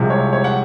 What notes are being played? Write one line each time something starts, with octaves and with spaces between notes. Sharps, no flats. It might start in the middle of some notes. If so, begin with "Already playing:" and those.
Already playing: C2 C3 F3 G#3
C#5
C#5
F#5